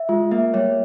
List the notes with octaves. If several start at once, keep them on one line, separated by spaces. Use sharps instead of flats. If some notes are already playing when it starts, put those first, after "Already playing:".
Already playing: E5
G#3 F4
A#3 E5
G3 C#5